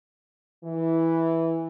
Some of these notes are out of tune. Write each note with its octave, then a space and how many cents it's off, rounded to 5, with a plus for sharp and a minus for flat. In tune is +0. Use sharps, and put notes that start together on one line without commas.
E3 -5